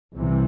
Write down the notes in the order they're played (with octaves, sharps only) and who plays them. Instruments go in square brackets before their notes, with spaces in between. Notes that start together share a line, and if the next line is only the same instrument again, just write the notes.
[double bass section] C2 C3 E3